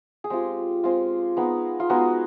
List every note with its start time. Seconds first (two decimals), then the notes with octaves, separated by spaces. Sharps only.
0.24 G#4
0.30 G#3 C4 F4 G4
0.84 G#3 C4 F4
1.37 G#3 B3 D#4
1.80 F4
1.89 G#3 B3 D#4 F#4